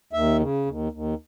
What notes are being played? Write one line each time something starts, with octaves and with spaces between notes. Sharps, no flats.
D#2 E5
C#3
D#2
D#2